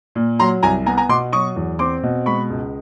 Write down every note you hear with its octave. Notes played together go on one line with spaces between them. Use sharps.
A#2
F#3 A#5 C6
C2 G#5 A#5
B3 G#5 A#5
G#5 A#5
B2 C6 D6
F#3 C#6 D#6
E2
C4 C6 D6
B2
G#3 B5 C#6
C#2